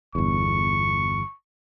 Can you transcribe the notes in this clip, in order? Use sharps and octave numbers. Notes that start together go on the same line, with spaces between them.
G1 E2 C#6